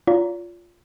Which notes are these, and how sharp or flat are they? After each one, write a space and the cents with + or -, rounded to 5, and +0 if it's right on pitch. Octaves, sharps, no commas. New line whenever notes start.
F4 +0 D5 -45 A#5 +0